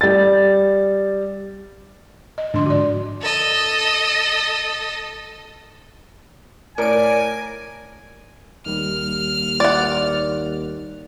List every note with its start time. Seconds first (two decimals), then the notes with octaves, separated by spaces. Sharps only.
0.01 G3 A6
2.38 D#5
2.54 G#2 D3 F3 D4 C6
2.66 F#4 D5
3.21 A4 D#5
6.78 A2 A#4 D5 G#5 D7
8.66 D#2 G3 A#3 D#4 F6
9.60 D5 F#5